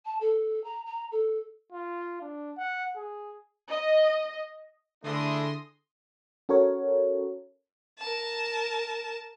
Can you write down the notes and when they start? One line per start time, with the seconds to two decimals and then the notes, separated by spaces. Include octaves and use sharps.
0.05 A5
0.20 A4
0.64 A#5
0.86 A#5
1.12 A4
1.72 F4
2.21 D4
2.57 F#5
2.96 G#4
3.70 D#5
5.04 D3 A3 D4 E4 G#4 C6 D#6 A#6
6.49 C#4 F#4 A4 A#4 C#5
7.99 A#4 A5